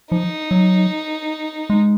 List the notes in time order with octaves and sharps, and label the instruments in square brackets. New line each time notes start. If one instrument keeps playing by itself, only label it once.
[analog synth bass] F3 [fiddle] D#4
[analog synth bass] F#3
G#3